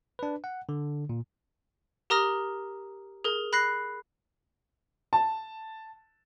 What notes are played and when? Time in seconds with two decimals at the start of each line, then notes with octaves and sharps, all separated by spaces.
0.19 D4 B4
0.44 F#5
0.69 D3
1.09 A#2
2.10 G4 A#4 A#5 D#6 F6 A#6
3.24 G#4 A#4
3.53 B5 F#6 A#6 C7
5.13 A5